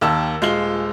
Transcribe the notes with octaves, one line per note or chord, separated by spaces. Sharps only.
D#2 D#3 A5 E6
D#1 G#3 F4 C7 G7